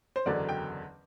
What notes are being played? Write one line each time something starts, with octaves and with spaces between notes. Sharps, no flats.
C5
F#1 E2 D3 F#3 D5
G5